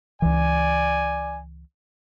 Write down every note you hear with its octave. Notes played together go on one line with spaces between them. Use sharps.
C#2 E3 D5 G#5